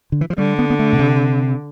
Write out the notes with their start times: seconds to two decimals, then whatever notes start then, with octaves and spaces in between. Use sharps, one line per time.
0.12 D3
0.21 E3
0.30 F3
0.38 D3 G3
0.59 B3
0.70 B3
0.79 A3
0.93 B2
0.99 C3